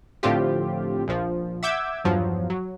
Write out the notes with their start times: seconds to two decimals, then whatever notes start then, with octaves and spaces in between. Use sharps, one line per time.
0.23 A2 D3 F3 C4 F4 G4
1.08 A#1 F3
1.63 E5 F#5 D6 E6 G6 G#6
2.04 E2 G2 F3 F#3
2.50 F#3